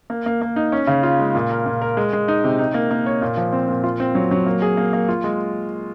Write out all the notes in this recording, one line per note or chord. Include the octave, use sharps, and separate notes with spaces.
A#3
A#3
A#3
D#4
C#4
C#3
F4
G#3
A#2
A#4
A#2
A#4
G#3
G#3
D#4
C3
D#4
A#3
A#3
C#5
A#2
F3
C4
A#2
F4
C4
F#3
F#3
A#3
G#4
A#3
A#3
F4
G#3